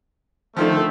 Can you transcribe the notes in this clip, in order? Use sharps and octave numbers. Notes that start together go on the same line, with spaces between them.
D3 D#3 F3 A3 C5